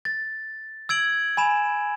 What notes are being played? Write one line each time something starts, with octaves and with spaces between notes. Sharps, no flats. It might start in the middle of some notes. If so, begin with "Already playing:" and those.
A6
E6 G#6 D7 F#7
G#5 B5 E7